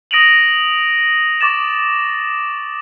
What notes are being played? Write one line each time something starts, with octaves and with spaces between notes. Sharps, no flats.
D#6 A#6 D7 D#7 F7 F#7
C#6 D6 A6 E7